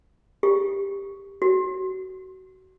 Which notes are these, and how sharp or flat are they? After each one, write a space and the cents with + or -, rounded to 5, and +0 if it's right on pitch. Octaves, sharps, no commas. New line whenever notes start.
G4 +15
F#4 +25